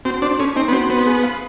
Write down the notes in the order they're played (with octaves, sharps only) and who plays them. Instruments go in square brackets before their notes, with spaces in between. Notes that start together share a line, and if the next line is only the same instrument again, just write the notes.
[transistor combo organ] C4 [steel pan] F#4
[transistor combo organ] D4 [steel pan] C5
[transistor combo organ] C#4 [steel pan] A4
[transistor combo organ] C4 [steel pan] D#4
[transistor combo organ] B3
[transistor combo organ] C4 [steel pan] F#4
[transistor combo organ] B3 [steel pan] C5
[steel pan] G#4
F5